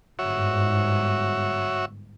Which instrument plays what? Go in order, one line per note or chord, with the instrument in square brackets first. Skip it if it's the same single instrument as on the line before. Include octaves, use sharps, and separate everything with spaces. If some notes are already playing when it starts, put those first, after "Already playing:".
[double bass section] G1 G#2 [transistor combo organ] F#4 C#5 E5